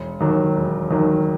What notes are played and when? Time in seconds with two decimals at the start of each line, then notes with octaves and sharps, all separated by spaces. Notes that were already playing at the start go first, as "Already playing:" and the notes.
Already playing: E1
0.21 D#2 D#3 F#3
0.57 E1
0.91 D#2 D#3 F#3